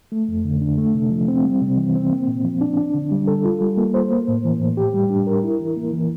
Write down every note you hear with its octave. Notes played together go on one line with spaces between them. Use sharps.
A3
F2
D3
D4
A3
C3
F3
C4
G3
C3
E3
C4
A#3
A#2
F3
D4
D4
D3
G3
A4
F4
G3
A#3
C5
A#3
A2
E3
A2
G4
G3
D4
A#4
E4
E3
A#3
E3